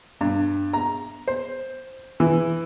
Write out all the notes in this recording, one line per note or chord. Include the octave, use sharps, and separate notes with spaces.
G2
A#5
C5
E3